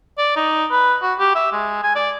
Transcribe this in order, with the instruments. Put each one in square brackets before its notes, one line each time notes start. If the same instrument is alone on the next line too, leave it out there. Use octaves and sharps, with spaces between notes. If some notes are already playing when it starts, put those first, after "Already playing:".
[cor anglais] D5
D#4
B4
F#4
G4
E5
G#3
G#5
D5